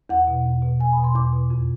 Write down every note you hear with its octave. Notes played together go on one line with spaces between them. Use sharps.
E2 F#5
B2
E2
B2
E2 G#5
B2 B5
C6
E2 D6
B2
F2